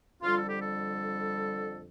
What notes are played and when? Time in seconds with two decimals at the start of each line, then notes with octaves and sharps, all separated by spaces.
0.23 F2 D3 G3 F4
0.36 A4
0.48 G4
0.61 A4